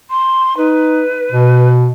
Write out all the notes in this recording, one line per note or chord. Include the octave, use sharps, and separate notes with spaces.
C6
D#4 B4
B2